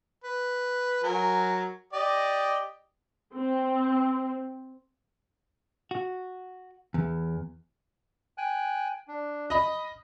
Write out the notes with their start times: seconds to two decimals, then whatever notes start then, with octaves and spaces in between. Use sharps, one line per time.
0.24 B4
1.04 F#3 A#4 G#5
1.93 G4 D5 D#5
3.34 C4
5.91 F#4
6.94 E2
8.38 G5 G#5 F#6
9.08 D4
9.50 D#5 B5 D#6